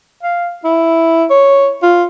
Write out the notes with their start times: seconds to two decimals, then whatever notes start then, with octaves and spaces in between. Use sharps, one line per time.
0.23 F5
0.65 E4
1.30 C#5
1.83 F4